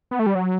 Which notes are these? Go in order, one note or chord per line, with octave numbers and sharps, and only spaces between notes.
B3
A3
G3
F#3